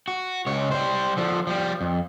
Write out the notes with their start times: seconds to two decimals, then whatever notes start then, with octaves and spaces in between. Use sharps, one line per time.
0.08 F#4
0.46 C#2 C#5
0.71 G3 C5
1.17 D3 F3
1.47 F3 G3
1.81 F2